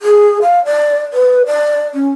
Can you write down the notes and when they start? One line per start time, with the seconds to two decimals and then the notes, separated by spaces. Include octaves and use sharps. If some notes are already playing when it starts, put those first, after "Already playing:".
0.02 G#4
0.42 F5
0.65 D5
1.13 B4
1.46 D5
1.94 C#4